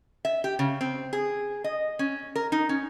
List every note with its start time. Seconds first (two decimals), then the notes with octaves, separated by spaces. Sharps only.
0.25 E5
0.44 G4
0.59 C#3
0.81 C4
1.13 G#4
1.64 D#5
1.99 C#4
2.36 A#4
2.52 D#4
2.69 C#4